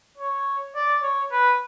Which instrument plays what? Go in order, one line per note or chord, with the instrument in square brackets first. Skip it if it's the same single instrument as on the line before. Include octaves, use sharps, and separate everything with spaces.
[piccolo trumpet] C#5
D5
C#5
B4